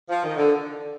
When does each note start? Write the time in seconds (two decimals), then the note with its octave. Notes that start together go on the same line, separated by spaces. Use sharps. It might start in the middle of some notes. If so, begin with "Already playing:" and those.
0.09 F3
0.24 D#3
0.37 D3